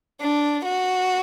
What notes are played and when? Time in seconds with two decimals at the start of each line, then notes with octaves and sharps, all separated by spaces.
0.21 D4
0.64 F#4